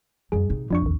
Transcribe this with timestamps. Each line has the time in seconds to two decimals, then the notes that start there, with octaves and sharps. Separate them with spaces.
0.32 F#2 G3 G#4
0.50 C3 D#4
0.70 F2 F3 D4 C#6
0.82 A1 D#2